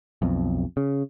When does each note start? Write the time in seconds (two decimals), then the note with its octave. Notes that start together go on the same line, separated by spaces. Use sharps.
0.22 B1 F2
0.77 C#3